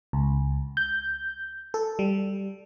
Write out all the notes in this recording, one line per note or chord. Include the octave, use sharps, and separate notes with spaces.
C#2
G6
A4
G3